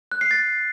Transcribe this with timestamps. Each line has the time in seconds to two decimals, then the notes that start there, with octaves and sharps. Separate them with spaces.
0.12 F#6
0.21 C7
0.31 A6